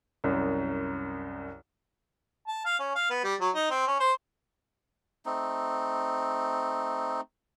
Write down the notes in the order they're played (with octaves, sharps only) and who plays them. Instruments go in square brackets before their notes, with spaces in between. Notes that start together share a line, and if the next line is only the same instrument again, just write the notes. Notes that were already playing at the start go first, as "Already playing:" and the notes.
[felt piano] C2 F#2
[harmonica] A5
F5
C#4
F5
B3
G3
F#3
D#4
C4
C#4
C5
[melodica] A3 C4 D#4